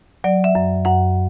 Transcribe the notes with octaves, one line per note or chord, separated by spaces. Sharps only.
F#3 D5
E5
F#2
F#2 F#5